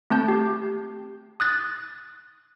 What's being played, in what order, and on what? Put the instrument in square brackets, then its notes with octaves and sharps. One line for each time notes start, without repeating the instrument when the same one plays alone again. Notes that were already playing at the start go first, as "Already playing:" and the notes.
[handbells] A3 C4 A5 G6
G4
D#6 F#6 A6